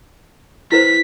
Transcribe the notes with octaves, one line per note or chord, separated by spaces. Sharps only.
E4 B4 C5 B6